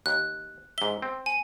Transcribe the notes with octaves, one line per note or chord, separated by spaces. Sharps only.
D#2 F#6
G#2 E5 G7
C4
G#5